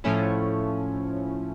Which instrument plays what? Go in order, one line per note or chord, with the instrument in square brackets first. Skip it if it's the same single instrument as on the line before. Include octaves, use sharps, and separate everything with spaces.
[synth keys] A2 F3 A3 C#4 E4